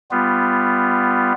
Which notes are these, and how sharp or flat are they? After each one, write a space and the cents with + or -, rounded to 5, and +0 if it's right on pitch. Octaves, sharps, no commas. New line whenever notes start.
G3 +10 B3 +10 F4 +0